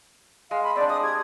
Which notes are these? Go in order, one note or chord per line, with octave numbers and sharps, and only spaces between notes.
G#3 F5
B5
C4 D4 D5
G#3 D#6
G4 G#6